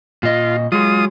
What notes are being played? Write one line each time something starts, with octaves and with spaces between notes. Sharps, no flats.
A#2 F4 D#5
F#3 G#3 F4 D#6